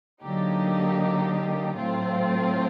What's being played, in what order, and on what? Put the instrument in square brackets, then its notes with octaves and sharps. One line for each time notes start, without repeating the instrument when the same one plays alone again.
[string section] D3 F#3 A#3 D#4 G4
A2 F#3 A3 C4 F4